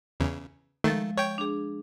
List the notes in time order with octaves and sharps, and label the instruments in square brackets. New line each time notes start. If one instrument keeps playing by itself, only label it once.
[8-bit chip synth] E2 C#3
[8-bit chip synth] D#3 A3 [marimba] F3 G#3
[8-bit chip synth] C#5 G5
[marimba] D4 G#4